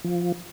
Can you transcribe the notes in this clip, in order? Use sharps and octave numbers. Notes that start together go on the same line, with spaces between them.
F3